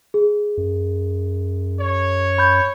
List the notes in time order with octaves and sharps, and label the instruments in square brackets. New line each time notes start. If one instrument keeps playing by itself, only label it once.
[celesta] G#4
[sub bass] F#2
[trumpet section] C#5
[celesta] B5 G6